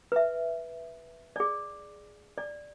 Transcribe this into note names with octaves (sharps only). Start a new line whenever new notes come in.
B4 E5
G#4 D5
D5